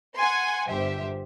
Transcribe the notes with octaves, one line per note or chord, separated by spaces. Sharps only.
F#5 G#5 C6
G1 G4 C5 E5